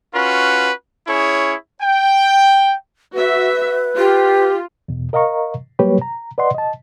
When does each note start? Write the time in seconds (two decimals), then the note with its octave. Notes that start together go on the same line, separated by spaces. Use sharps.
0.15 C#4 F4 F#4 B4
1.07 C#4 E4 G#4 C#5
1.81 G5
3.14 F#4 B4 E5
3.97 F4 G4
4.88 E2 B2
5.13 A#4 D#5 F5 A#5 C#6
5.79 F#3 G3 A#3 G4 B4 C#5
6.01 A#5
6.38 B4 D5 D#5 F#5 C6
6.55 D#5 A5